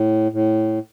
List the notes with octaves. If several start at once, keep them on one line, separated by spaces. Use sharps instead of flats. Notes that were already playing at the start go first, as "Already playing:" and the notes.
Already playing: A2
A2